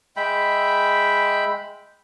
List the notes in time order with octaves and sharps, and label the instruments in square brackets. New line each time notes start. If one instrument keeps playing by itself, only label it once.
[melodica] G#3 E5 G5 B5